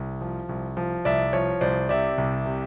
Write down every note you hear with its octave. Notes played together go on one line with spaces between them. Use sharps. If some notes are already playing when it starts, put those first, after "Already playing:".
Already playing: C2
F3
C2
F3
C2 D5 E5
F3 C#5
C2 C5 D5
C3 D5 E5
C2
C3